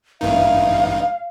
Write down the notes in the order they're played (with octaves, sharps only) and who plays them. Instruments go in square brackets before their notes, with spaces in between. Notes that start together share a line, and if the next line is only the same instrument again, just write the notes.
[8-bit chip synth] A1 G2 D#4 [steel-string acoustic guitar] A#3 E4 [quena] F5